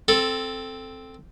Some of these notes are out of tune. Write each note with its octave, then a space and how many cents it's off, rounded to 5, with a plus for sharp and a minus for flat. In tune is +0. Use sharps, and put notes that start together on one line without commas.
C4 +0 A4 +0